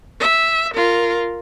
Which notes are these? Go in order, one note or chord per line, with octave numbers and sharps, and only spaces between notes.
E5
F4 A#4